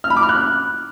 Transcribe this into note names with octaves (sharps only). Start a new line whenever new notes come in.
F6
B5
D6
F6
F#6